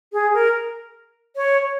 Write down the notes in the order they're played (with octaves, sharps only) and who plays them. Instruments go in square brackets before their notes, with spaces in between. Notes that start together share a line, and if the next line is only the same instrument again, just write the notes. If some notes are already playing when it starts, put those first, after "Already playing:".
[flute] G#4
A#4
C#5